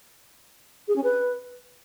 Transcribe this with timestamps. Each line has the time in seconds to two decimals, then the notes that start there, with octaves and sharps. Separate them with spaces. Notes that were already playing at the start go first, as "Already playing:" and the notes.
0.88 G#4
0.96 C#4
1.04 B4